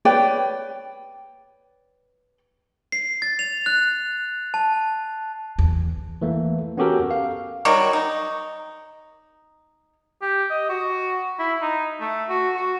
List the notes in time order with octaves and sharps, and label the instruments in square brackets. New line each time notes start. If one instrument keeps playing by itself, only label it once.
[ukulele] B4 C#5 D5 G5
[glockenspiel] C7
A6
F7
F#6
A5
[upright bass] E2
[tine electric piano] E3 A3 A#3
B3 C#4 F#4 G4 A4 A#4
F5
[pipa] D#3 F#3 G3 F#4
D#4
[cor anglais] G4
D#5
F#4
E4
D#4
A3
F#4
F#4